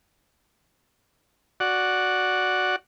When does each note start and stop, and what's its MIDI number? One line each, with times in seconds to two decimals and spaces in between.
1.60 2.76 66
1.60 2.76 74
1.60 2.76 78